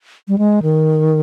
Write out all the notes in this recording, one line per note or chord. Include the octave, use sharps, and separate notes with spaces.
G3
G#3
D#3